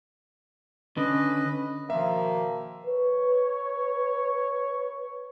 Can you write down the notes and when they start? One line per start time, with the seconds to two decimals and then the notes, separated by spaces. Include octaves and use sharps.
0.97 D3 C#4 B4 D#5
1.90 B2 D#3 F3 A#3 E5
2.87 B4 C#5